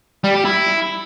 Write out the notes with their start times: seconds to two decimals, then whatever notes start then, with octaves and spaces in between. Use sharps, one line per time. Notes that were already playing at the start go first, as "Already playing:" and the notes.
0.24 G3
0.34 G4
0.45 E4